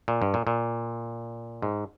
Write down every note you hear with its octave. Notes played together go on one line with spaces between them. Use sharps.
A#2
G2
A#2
A#2
G#2